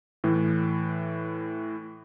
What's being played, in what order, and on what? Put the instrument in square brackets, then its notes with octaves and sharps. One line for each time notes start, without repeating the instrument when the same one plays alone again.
[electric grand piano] A2 E3